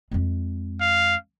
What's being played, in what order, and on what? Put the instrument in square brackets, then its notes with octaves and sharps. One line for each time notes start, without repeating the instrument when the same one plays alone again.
[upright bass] F2 G#3
[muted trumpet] F5